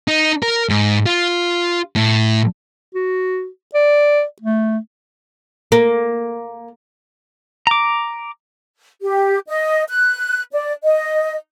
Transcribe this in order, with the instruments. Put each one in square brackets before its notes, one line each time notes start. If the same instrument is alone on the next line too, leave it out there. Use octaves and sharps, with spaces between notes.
[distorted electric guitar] D#4
A#4
G#2
F4
A2
[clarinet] F#4
D5
A3
[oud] A#3
[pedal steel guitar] A#5 D6
[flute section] G4
D#5
F#6
D5
D#5